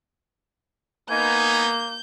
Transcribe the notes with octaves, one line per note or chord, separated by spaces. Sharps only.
A#3 B3 D#4 G#5 G6